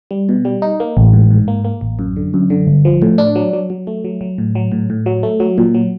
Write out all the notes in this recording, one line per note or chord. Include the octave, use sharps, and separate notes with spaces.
G3
B2
G3
D#4
A#3
A1
G#2
G#2
A#3
A#3
A1
F#2
D3
F#2
D3
G1
F3
A2
D4
F#3
F#3
F#3
A3
F#3
F#3
A2
F#3
A2
A2
F#3
A3
F#3
A#2
F#3